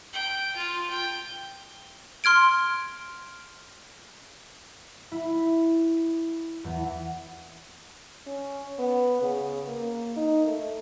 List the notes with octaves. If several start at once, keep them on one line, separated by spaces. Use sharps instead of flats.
G5
F4
G5
C6 F6 G#6 D7
E4
E2
C#4
B3
C#3
A#3
D#4
A3